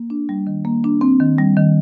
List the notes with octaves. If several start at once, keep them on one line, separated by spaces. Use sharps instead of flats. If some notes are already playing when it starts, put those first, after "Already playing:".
Already playing: A#3
D4
G3
D#3
A#3
D4
C4
D#3
G3
D#3